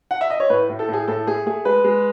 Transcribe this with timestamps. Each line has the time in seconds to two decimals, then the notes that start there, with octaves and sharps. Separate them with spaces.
0.11 F#5
0.21 E5
0.30 D#5
0.40 C#5
0.50 A2 B4
0.69 A2
0.79 A4
0.89 A2 G#4
1.08 A2 A4
1.27 A3 G#4
1.46 A3 G#4
1.65 G#3 B4
1.84 G#3